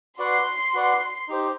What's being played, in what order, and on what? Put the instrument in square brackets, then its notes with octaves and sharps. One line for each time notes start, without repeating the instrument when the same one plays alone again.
[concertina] F#4 B4 D5 F#5 [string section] C6
[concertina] F#4 B4 D5 F#5
D#4 G4 C5